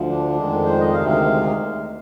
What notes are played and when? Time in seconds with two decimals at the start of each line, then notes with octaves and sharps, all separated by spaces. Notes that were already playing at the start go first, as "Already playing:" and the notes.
Already playing: D2 D3 F3
0.09 D4
0.37 F2 D#3 G#3
0.66 C5
0.80 D#5
0.94 D2 C3 D#3 G#3 F5
1.09 F5